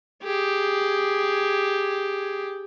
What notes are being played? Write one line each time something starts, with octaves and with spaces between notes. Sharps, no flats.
G4 G#4